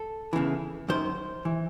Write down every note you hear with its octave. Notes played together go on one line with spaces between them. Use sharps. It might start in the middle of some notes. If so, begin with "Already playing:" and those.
Already playing: A4
E2 C#3 E3
F#2 D#3 C5
E3